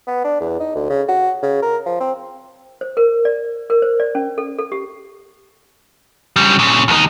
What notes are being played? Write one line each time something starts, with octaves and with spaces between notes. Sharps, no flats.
B3
D4
E2
D#4
D2
C#3
F#4
C#3
A#4
F3
C4
C5
A#4
D5
A#4
C5
D5
C#4
A4
A4
G4
C#3 G3
A#2 C#3
D#2 D#4